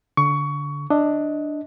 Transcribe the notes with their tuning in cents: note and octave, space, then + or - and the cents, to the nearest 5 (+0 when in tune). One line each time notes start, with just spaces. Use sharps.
D3 -20 C#6 +20
D4 +10 D#5 +20